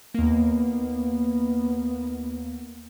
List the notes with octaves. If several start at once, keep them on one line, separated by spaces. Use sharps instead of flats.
D#2 A#3 B3